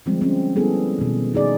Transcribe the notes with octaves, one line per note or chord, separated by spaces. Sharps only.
D3 F3 G3 G#3 C4
C4 C#4
G3 B3 E4 G#4 A4
B2 D#3
D#3 D#4 G#4 D5